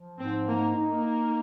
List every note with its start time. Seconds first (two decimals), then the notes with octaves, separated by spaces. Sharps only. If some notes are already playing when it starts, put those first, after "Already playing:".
Already playing: F3
0.18 G#2 C4
0.47 A#3 D#4
0.75 D#4
0.89 A#3
1.03 D#4